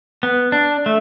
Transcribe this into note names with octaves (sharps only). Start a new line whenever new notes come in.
B3
D4
A3